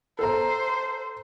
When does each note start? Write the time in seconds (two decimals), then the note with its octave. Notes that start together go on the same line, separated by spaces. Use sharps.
0.19 A4 C5 A#5